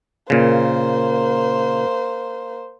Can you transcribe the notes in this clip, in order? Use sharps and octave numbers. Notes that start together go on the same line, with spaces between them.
A#2 C#3 A#3 C5